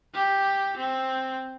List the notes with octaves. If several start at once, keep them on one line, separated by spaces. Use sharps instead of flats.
G4
C4